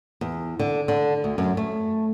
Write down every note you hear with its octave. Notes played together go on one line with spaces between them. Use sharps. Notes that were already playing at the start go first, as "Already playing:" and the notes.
E2
D3
D3
D2
F#2
A3